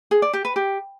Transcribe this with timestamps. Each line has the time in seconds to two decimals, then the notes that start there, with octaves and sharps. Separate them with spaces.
0.11 G#4
0.22 D5
0.33 G4
0.45 B4
0.56 G4